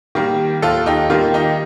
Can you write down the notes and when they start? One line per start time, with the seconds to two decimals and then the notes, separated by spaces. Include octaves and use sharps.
0.15 D#3 G3 A#3
0.62 D#2 F4 A4
0.86 D#4 G4
1.10 D#3 G3 A#3 F4
1.34 D#4 G4